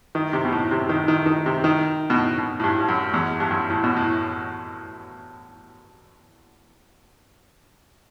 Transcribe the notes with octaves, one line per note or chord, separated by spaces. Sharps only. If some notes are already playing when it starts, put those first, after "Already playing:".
D#3
C3
B2
A2
C3
D#3
D#3
D#3
C3
D#3
B2
A2
B2
A2
G2
G2
F#2
E2
G2
F#2
A2
B2
A2